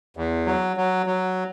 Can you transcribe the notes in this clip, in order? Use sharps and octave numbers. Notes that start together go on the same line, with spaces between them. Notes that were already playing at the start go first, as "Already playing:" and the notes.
E2
F#3
F#3
F#3